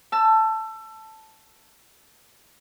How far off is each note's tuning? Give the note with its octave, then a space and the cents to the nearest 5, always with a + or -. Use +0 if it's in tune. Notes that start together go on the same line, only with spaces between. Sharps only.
A5 +0 E6 +25